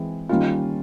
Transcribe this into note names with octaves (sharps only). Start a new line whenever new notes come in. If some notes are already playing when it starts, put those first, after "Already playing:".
Already playing: E3 G#3 C4 G#4
D#3 G3 A#3 C#4 F4